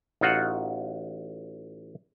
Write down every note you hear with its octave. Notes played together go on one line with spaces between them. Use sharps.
A1 D#4 F4 F#4 F#5